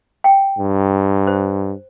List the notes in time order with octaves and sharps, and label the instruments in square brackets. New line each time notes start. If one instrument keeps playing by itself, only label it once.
[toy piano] G5
[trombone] G2
[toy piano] C5